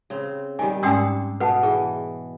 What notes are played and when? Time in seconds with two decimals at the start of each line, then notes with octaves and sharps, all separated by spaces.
0.10 C#3 C4
0.59 D#3 G3 G#5
0.83 G#2 G#3 C#4 D4 G5 D#6 E6
1.40 B2 B4 F#5 A5
1.63 E3 G#4